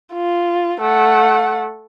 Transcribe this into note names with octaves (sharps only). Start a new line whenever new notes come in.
F4
A3 F#5